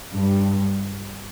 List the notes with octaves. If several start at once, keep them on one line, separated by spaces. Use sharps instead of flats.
G2